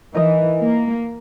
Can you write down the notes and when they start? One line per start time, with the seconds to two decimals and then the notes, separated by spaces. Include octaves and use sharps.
0.15 E3 D#4 A#4 D#5
0.61 A#3